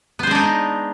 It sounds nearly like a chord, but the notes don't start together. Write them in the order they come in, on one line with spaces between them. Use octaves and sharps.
B3 C5 G#3 D4 D#4